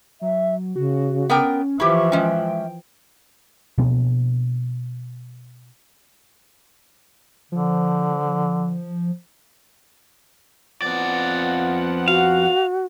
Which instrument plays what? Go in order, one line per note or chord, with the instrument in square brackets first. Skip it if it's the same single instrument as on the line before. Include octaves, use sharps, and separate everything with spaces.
[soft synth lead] F#3 [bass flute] E5
[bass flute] C#3 [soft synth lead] F#4
[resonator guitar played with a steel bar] B3 A#4 G5 [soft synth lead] C#4
[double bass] E3 F3 [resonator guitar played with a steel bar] E4 G4 [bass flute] E5 [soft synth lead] C#6
[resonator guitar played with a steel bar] G#3 C#4 [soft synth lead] G5
[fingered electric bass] B2 F3 A#3 D4
[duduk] D3 [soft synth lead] F3
[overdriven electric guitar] F2 D5 [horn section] F3 B3 F#5
[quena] F#4 [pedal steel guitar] F5